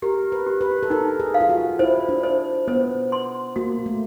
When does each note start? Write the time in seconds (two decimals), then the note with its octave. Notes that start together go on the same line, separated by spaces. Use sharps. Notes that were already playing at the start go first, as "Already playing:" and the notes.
0.02 G4 A#4
0.32 B4
0.46 G4
0.61 B4
0.83 A4
0.90 D#4 A#4
1.20 G#4
1.34 F5
1.41 F4
1.50 F#4
1.79 E4 C5
2.09 D4
2.23 C5
2.68 B3 C5
3.12 C6
3.56 A#3 F#4
3.86 A3